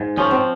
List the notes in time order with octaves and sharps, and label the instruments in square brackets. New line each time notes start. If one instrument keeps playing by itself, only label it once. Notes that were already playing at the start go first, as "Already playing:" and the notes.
Already playing: [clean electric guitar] G#2
[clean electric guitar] F3 [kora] C#4
[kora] C4